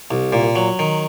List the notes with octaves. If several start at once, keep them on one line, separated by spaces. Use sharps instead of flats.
C2
A#2
F#3
D#3